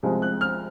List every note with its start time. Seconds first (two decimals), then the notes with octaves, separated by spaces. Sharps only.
0.03 C2 C3 F3 G#3
0.22 F#6
0.41 F6